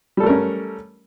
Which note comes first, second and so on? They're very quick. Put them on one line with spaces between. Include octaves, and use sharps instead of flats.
G3 A4 A3 A#4 C#4